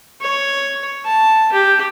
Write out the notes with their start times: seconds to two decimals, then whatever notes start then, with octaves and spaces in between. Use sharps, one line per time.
0.21 C#5
1.05 A5
1.53 G4